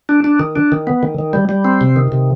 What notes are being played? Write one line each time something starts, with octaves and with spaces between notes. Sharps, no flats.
D4
D4
D#3
D4
D#3
B3
D#3
D#3
G3
G3
C4
C3
D#3
C3